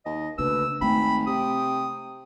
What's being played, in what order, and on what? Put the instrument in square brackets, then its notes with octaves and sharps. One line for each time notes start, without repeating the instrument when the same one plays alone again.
[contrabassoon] D#2 [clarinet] D#5
[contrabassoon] D2 [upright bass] C#3 A#3 [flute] B4 [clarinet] E6
[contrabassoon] G#1 [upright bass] A3 [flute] G5 [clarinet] B5
[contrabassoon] C3 [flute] G5 [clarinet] D#6